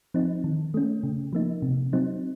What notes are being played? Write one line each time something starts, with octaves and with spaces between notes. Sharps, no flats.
F3 C4 D#4
D#3
A3 C#4
C#3
F3 A#3 D#4
C3
F#3 C4 D#4